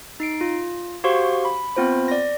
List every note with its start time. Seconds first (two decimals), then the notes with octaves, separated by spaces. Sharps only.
0.20 D#4 C7 D7
0.41 F4
1.04 F#4 G4 C5 F5 C6 C#6
1.45 B5
1.76 B3 C4 F4 C5 B5
2.08 D5 A#6